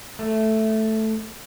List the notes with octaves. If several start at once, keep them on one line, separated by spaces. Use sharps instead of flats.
A3